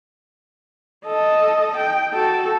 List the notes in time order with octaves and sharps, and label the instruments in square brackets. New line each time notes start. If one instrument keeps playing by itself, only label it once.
[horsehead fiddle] A4 D#5
G5
F#4 A4